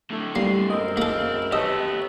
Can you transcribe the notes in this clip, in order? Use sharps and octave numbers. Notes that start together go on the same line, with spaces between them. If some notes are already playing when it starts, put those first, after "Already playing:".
A2 D3 A3
G3 A#3 C7
F#2 C4 A#4 D#5
A#3 G#4 A4 F5
A3 B3 G4 B4 C#5 D#5 E6